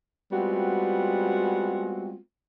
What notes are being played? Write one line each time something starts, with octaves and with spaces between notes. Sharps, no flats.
G3 G#3 B3 C4 F4 F#4